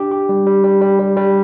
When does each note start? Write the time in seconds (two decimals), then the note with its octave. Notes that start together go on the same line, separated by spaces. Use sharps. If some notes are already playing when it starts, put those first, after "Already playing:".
Already playing: D4 G4
0.11 G4
0.29 G3
0.47 G3
0.64 G3
0.81 G3
0.99 G3
1.16 G3